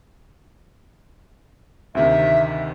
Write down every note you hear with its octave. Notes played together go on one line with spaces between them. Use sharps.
D2 C3 D#3 E5